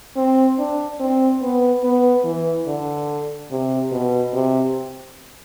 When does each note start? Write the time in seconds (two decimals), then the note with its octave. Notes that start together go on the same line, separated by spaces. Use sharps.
0.17 C4
0.59 D4
1.01 C4
1.42 B3
1.84 B3
2.25 E3
2.67 D3
3.51 C3
3.92 B2
4.34 C3